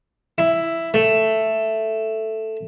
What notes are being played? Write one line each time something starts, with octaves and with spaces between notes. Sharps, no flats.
E4
A3